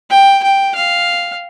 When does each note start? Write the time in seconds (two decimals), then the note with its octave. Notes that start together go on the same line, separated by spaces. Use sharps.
0.10 G5
0.43 G5
0.75 F5